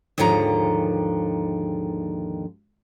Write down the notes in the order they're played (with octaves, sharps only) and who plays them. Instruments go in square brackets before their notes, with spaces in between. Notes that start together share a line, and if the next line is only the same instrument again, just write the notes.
[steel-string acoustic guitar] D#2 G#2 D3 D#3 F3 A#5